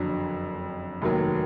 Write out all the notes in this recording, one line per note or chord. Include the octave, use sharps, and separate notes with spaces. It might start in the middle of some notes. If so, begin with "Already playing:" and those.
Already playing: F#1 F2 D3 F#3
F1 D#2 D#3 F#3